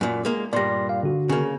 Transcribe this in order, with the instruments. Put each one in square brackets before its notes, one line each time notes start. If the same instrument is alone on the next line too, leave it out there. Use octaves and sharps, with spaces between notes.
[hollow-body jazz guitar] F#2 A#2
G#3 A#3
[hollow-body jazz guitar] G2 A#2 [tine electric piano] D5 C6 A#6
[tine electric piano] F5
D3 F#4
[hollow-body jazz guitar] C#3 A#3